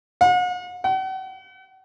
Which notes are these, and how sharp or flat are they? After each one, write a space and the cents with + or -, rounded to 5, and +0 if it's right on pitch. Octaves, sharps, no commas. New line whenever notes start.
F#5 -40
F#5 +45